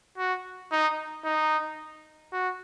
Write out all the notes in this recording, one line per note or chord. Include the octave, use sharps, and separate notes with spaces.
F#4
D#4
D#4
F#4